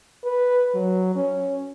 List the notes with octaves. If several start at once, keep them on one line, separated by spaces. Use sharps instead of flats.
B4
F#3
C#4